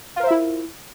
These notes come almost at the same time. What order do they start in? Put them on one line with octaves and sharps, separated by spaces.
F4 A#4 C5 E5 E4